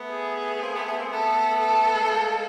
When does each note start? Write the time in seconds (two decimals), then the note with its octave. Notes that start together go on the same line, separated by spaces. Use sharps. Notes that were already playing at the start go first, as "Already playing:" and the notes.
Already playing: A3 B3
0.10 G#4
0.60 A#3 C4
0.73 A3 B3
0.85 A3 B3
0.98 A#3 C4
1.10 A3 B3 A4
1.60 A4
1.94 G#3
2.03 A3
2.10 G#3 A#3